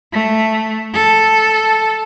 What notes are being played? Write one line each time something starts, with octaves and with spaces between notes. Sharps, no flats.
A3
A4